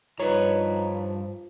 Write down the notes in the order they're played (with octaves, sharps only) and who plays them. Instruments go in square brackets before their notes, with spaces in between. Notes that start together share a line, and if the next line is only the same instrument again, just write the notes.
[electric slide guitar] G2 A#5 [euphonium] F3 [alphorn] D#4 [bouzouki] B4 C#5